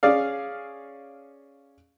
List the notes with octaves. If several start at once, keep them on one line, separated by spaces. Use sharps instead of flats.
C#4 G#4 D5 F5